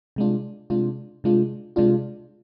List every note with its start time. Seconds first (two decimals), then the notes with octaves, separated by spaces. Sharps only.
0.16 C3 G#3 D4 F4
0.70 C3 G#3 D4 F4
1.24 C3 G#3 D4 F4
1.76 C3 G#3 D4 F4